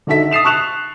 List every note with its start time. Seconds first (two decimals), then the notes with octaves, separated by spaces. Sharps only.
0.07 D3 D#4 F#4 A4 E5 B6
0.31 D#6 A6 C7 E7 F7
0.44 A5 C#6 F#6 E7 F7